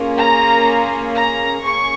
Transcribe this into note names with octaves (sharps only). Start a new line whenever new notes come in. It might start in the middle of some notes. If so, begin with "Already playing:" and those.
Already playing: A#3 C#4 F4 G#4
A#5
A#5
A#3 C#4 G#4 C#6